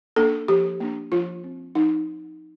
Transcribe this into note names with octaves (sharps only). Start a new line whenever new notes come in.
A#3 D4 A4
F3 G4
A#3 D4
F3 F4
C4
F3 D#4